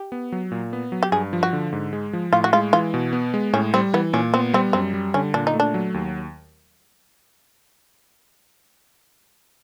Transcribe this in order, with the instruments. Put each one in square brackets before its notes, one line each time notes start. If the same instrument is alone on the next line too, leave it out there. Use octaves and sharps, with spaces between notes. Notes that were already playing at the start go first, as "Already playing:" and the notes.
Already playing: [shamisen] G4
[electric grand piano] B3
F#3
A#2
B3
F#3
[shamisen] G4
[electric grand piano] G2 [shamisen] G#4
[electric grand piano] F3
[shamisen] F#4
[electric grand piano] D3
G#2
G#3
F3
[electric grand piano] A2 [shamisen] F4
[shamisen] F#4
[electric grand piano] G#3 [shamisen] F4
[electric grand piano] E3 [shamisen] F4
[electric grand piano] B2
B3
G#3
[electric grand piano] A2 [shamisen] C#4
[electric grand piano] G3 [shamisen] C4
[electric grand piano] E3 [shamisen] B3
[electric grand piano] A#2 [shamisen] C#4
[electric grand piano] B3 [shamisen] C4
[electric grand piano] G3 [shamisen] C4
[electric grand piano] F#2 [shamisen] C4
[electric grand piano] G3
[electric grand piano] D3 [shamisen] C#4
[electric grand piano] A#2 [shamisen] D4
[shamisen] D#4
[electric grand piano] A3
[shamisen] D4
[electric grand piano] F#3
D#2